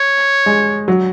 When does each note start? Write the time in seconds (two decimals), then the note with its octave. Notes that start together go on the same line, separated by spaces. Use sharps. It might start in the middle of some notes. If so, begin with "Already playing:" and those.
Already playing: C#5
0.46 G#3
0.88 F#3